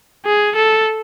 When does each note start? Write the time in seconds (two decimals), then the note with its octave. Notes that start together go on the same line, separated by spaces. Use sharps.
0.25 G#4
0.56 A4